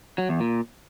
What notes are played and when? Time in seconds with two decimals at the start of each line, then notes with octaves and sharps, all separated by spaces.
0.18 F#3
0.29 E2
0.40 A#2